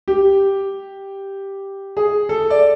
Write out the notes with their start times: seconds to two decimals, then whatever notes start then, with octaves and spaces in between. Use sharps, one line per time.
0.08 G4
1.97 G#4
2.29 A4
2.50 D5